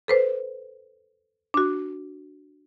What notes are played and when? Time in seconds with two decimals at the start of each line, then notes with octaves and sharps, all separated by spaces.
0.08 A4 B4 C5
1.54 D4 F#4